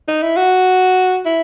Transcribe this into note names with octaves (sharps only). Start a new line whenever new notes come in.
D#4
E4
F#4
E4